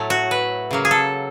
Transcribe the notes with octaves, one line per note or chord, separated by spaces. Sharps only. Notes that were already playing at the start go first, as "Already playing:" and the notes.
Already playing: A2 F#3 A3
F#4
B4
C#3 F#3 A#3
G#4
A4